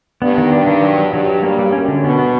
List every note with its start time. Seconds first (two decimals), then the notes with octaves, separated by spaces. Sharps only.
0.22 G2 B3
0.38 D#3
0.52 G2 D4
0.67 D#3
0.83 F#3
0.98 F#3
1.13 G2 F#3
1.28 F#3
1.43 G2 A#3
1.59 G3
1.73 F#2 C#4
1.88 D3
2.03 B2 B3
2.19 B3